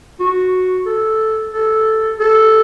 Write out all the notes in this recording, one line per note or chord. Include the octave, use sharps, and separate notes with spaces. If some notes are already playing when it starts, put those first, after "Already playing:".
F#4
A4
A4
A4